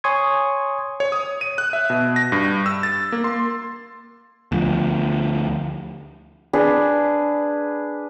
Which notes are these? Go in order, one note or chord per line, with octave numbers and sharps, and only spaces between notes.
C#5 G#5 C6 C#6 D#6 G#6
C#5
D#6
D#7
F#6
E5
B2
A#6
G2
E6
A6
A#3
C6
D2 F3
D4 G#4 B4